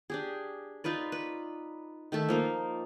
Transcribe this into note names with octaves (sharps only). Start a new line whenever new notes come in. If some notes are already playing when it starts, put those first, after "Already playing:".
D4 G4 G#4
D#4 F4 B4 D5
B4
D#3 A3 A4 E5
F3 A#3 D#4